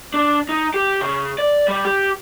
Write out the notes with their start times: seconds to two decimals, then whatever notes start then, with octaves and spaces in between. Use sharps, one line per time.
0.14 D4
0.49 D#4
0.74 G4
1.01 C#3
1.38 D5
1.68 G3
1.85 G4